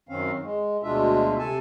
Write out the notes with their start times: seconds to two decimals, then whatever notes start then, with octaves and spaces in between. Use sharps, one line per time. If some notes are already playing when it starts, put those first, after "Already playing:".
0.09 F#2 D#3 C4 C#4 F5
0.43 G#3
0.83 D2 B2 G#3 D4 F4 E5
1.39 C3 A4 G#5 A5